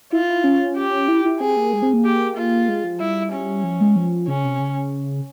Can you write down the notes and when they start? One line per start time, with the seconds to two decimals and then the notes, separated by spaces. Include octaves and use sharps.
0.12 E4 F4
0.29 E4
0.44 C#4
0.76 G4
1.08 E4
1.25 E4
1.40 C4 G#4
1.57 A#3
1.73 G#3
1.82 C4
1.93 A#3
2.05 G4
2.37 F4
2.68 G#3
2.84 F3
3.00 G3 E4
3.32 C#4
3.64 F3
3.81 G#3
3.96 F3
4.28 C#3 C#4
4.44 C3
4.60 C#3